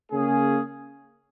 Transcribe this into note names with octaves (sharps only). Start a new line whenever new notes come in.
C#3 A#3 C#4 G#4